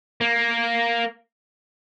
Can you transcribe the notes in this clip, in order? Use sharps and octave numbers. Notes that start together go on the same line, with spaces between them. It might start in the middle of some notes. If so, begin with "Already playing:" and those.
A#3